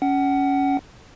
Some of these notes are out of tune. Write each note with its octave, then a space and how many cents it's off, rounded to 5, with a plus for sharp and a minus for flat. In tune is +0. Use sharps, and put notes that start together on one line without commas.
C#4 +10 F#5 +25